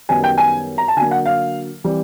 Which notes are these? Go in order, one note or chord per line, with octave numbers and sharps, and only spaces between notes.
F#2 D#3 G3 B3 G#5
G5
G#5
A#5
A5
D3 F#3 A#3 G#5
F#5
F5
E3 G3 C4